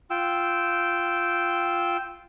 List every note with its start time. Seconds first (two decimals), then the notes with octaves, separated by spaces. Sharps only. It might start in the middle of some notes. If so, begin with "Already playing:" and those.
0.10 F4 G5 E6